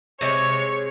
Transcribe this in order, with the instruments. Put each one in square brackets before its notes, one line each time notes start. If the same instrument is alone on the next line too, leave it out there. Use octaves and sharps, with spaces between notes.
[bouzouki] C3 G#3 [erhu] C#5